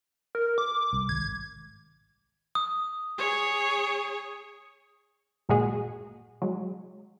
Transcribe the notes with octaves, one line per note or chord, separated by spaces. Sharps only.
A#4
D6
C2
G#1 G#6
D#6
G#4 C#5
G1 A#2 G#3 F#4 G#4
F#3 G#3